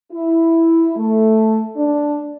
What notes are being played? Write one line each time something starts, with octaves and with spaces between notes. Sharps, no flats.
E4
A3
D4